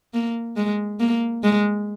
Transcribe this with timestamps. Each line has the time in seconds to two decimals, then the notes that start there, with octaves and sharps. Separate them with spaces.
0.14 A#3
0.57 G#3
1.00 A#3
1.43 G#3